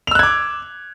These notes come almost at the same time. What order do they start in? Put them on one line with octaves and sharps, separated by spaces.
F7 E6 F#6 G#6 D6